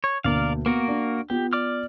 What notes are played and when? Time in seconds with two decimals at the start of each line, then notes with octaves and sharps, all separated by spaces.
0.04 C#5
0.24 D2 B2 A#3 A#4 D5 F5
0.66 A#3 B3 F#4 A#4
0.88 D4
1.30 B3 F4 G4
1.53 D5 D6 F6